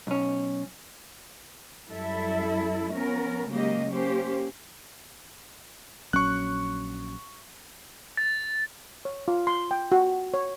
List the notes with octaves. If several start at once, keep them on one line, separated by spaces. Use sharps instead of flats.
B1 C#4
F#2 G3 E4 A4 E5
F3 B3 C#4 A#4
C#3 F#3 G#3 A#3 G4 D#5
A#3 C#4 G4 C5
A#1 F#3 C#4 C#6 F#6
A6
C#5
F4
C6
G5
F#4
C#5